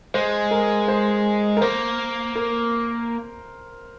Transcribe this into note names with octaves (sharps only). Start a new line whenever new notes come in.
G#3 C5
A#4
C5
A#4
A#3 C5
A#4